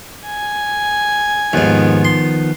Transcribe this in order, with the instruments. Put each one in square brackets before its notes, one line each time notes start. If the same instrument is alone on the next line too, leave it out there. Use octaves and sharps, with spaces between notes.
[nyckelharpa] G#5
[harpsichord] D#2 G#2 [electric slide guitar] D#3 F3 B3
[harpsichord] C6